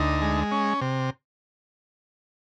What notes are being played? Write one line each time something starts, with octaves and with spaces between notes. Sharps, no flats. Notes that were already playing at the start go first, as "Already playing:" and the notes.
Already playing: D2 D#4
G#3
C#4
C3